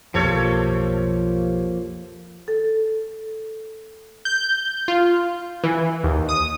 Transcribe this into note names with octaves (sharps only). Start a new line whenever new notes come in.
B1 F2 F3 A#3 G4 A4 C#5
A4
G6
F4
E3
D#2
D#6